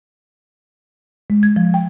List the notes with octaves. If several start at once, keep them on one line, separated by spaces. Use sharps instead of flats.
G#3
G#6
F3
G5